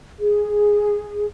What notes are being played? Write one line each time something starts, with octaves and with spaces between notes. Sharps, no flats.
G#4